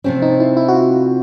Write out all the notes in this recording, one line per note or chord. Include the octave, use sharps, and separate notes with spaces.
C3 F3 A3 C4 C#4
D#4
E4
E4
F#4
F4